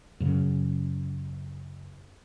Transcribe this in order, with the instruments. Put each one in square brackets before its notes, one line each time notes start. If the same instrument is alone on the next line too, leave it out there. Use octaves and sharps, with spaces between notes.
[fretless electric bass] F#2 C#3